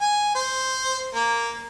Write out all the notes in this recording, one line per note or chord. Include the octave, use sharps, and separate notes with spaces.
G#5
C5
A#3